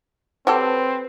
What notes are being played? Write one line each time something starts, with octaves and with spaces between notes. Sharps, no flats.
F#3 C4 G4 A4 B4